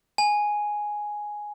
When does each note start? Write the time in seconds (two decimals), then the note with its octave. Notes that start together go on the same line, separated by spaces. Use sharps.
0.18 G#5